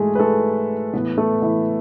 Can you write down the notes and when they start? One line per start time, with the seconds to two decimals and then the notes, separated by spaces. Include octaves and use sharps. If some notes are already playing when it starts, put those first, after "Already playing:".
Already playing: G#2 E3 G#3 A3 G#4
0.15 B4
0.19 A3 A4
0.93 A2 E3 B3 B4
1.18 A3 A4
1.42 E3 E4